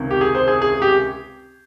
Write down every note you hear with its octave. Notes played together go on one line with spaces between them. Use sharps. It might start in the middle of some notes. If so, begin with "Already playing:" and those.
Already playing: C#2 C3 D#3
G4
G#4
C5
G#4
G#4
G4